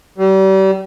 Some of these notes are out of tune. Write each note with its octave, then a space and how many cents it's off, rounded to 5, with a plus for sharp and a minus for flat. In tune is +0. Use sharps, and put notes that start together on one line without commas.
G3 -35